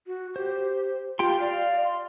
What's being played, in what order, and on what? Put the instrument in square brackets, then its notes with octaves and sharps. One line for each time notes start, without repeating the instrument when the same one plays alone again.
[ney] F#4
[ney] G4 [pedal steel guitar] C5
[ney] F4 [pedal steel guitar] G4 G5 C6
[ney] D5 [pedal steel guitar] F5
[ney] C6